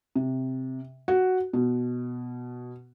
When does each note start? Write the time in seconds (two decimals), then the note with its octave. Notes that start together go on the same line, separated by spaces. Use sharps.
0.15 C3
1.08 F#4
1.53 B2